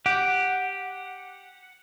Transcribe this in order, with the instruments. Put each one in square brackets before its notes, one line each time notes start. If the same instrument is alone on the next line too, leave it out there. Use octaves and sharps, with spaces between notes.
[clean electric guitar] G4 [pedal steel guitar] F#5